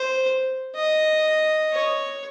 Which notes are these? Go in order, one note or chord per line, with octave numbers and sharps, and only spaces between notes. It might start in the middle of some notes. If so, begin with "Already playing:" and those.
Already playing: C5
D#5
C#5